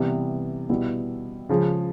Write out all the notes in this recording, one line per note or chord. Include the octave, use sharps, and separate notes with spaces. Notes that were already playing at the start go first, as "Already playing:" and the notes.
Already playing: C3 E3 G3 B3
B2 G3 B3 E4
C#3 F3 G#3